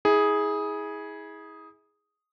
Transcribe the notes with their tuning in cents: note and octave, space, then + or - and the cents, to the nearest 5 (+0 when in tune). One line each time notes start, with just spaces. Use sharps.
E4 -35 G#4 +0